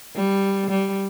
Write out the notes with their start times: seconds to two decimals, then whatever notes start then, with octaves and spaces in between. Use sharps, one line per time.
0.16 G3
0.70 G3